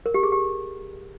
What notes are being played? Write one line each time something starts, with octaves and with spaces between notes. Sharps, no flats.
A#4
G4
G#4
G4